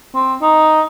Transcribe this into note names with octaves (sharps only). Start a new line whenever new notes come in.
C4
D#4